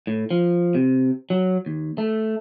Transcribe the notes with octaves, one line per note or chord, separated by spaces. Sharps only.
A2
F3
C3
F#3
D#2
A3